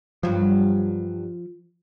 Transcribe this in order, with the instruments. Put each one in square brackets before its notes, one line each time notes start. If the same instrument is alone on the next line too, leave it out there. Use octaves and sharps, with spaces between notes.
[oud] G2 F#3 [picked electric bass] F3